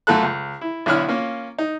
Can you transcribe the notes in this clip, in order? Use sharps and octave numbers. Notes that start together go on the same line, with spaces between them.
F#2 A3 F4 A4 F#6
C#2
E4
B1 D3 E4 C#5 F6
A#3 C#4 F4
D#4